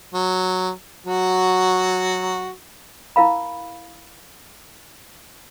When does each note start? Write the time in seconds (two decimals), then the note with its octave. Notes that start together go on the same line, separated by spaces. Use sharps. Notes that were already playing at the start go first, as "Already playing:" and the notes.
0.14 F#3
1.07 F#3 F#4
3.16 E4 A#4 F5 B5